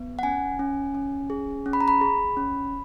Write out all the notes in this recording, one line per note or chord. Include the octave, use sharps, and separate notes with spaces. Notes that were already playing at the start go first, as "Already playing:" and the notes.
Already playing: B3
F#5
C#4 G#5
C#4
C#4
G#4
C#4
B5
A#5
B5
G#4
C#4